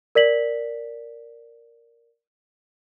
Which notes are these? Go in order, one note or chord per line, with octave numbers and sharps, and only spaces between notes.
A#4 D5 B6 F#7